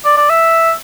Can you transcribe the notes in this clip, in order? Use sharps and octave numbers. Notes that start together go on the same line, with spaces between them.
D5
D5
E5